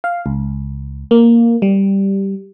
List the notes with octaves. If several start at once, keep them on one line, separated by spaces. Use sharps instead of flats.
F5
C#2
A#3
G3